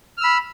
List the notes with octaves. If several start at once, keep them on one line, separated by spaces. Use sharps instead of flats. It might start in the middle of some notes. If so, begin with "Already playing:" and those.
B5 E6 F6